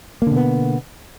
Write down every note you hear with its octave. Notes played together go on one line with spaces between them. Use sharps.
B2 D3 A#3 B3